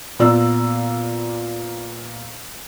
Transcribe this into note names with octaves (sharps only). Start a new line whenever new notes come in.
A#2 B3 F4 D5 A#5 E6